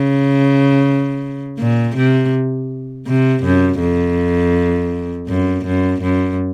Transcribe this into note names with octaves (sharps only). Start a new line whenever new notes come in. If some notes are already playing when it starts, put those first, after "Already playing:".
Already playing: C#3
A#2
C3
C3
F#2
F2
F#2
F#2
F#2